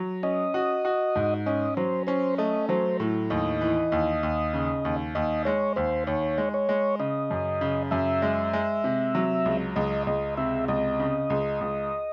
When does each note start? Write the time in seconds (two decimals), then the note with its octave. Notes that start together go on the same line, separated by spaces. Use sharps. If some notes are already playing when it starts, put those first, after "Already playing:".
Already playing: F#3
0.23 C#4 D#5
0.54 F#4
0.85 F#4
1.15 G#2
1.46 C#4 D#5
1.77 F#3 C5
2.07 C#4 C5
2.38 A3 D#5
2.69 F#3 C5
3.00 A2
3.30 D#2 D#5
3.61 E3
3.92 D#2
4.23 D#2
4.53 C#3
4.85 D#2
5.15 D#2 D#5
5.45 G#3 C#5
5.76 D#2 C5
6.07 D#2 C#5
6.38 G#3
6.54 C#5
6.69 G#3
6.99 C#3 D#5
7.31 F#2
7.61 C#3
7.91 F#2 E5
8.22 G#3
8.53 G#3
8.84 C3
9.15 F#3
9.46 C#2
9.76 C#2 D#5
10.07 C#2 D#5
10.37 C3 E5
10.68 C#2 D#5
10.99 C#3
11.30 C#2
11.61 C#2